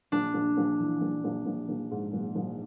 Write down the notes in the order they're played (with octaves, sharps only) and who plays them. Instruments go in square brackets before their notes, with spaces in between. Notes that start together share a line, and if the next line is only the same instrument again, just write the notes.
[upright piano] A#1 [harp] D4
[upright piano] A#1
A#1
E3
A#1
A#1
A#1
A#1
G#2
A#1
A#1